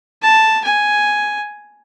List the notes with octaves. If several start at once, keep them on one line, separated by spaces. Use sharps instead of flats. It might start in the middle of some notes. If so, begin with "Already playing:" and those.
A5
G#5